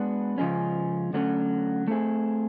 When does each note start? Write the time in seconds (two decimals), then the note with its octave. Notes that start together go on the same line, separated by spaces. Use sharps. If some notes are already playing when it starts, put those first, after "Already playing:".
Already playing: G#3 B3 D4 F#4 B4
0.38 C#3 F3 G#3 C#4
1.13 D3 F#3 A3 C#4
1.88 A3 C4 E4 G#4